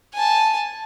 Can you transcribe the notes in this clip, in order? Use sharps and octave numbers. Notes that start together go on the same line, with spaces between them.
G#5 A5